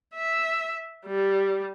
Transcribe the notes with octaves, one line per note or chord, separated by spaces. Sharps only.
E5
G3